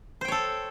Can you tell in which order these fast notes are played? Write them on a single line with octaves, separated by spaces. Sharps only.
C5 G5 C#5 A4